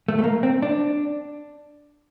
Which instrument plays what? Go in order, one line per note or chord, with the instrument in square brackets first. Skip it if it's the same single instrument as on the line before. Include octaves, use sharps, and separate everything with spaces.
[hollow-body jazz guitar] A3
A3
A#3
C4
D4